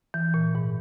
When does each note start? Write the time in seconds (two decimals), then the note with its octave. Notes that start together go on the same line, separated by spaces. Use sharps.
0.14 E3
0.34 A#2
0.55 G#2